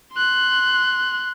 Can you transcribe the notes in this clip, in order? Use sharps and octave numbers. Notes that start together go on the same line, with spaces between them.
C6 F#6